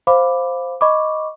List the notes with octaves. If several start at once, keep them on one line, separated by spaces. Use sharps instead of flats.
C5 F5 B5 D6
D#5 B5 C#6 D6